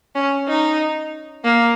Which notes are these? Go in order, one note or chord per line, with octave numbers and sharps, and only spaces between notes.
C#4
D#4
A#3